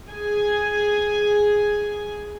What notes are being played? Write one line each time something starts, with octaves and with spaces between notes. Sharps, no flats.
G#4 G#5